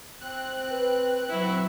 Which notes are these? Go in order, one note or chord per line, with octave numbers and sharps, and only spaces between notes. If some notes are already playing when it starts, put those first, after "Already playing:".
C4 F#6
B4
F#3 E4